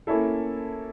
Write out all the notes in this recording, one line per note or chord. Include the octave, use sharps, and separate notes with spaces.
A#3 C#4 E4 A4